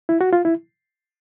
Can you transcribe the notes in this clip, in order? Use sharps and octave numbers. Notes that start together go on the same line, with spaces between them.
E4
F#4
F4
E4